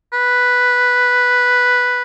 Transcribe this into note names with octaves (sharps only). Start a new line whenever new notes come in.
B4